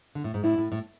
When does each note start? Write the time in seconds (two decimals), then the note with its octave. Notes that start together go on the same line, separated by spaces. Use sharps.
0.15 D3
0.24 A2
0.34 G#2
0.44 A2 E4
0.58 A2
0.72 A2